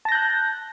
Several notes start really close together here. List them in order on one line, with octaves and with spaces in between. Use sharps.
A5 A#6 G6 F#6